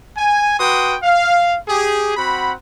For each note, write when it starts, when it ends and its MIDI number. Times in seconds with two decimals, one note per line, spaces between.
0.17 0.57 80
0.59 0.96 66
0.59 0.96 71
0.59 0.96 79
0.59 0.96 84
0.59 0.96 87
1.03 1.57 77
1.68 2.16 67
1.68 2.16 68
2.17 2.53 60
2.17 2.53 66
2.17 2.53 78
2.17 2.53 83